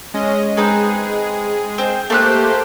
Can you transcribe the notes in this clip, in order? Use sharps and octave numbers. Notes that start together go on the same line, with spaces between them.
G#3 C#4 D#5
G#3 C4 D#4 G#4 B4
C4 C5
A3 A#3 G4 C5 C6 F#6